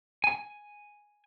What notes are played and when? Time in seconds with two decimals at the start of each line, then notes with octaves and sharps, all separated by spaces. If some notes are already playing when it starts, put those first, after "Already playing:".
0.24 G#5